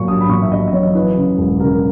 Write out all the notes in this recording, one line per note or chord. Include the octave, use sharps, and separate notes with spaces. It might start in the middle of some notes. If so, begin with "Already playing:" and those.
Already playing: A#2 F#3 C#6
A#1 D#6
B5
A#2 C#6
E5
A#1 D#5
D#5
F#3 C#5
E3 B4
C#3
E1
C#3 A#4